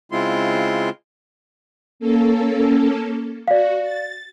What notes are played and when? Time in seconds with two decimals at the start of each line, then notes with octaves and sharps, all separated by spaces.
0.12 C#3 G#3 C4 E4 F4 C6
1.99 A#3 C#4 A4
3.48 F#4 D5 F5
3.81 A6